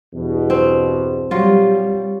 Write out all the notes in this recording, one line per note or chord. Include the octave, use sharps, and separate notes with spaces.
E2 G2 B2
C4
F#3 G3 F4